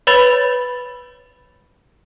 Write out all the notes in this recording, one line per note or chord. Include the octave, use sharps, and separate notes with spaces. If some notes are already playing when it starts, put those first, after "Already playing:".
B4 C#5 B5 A6 F7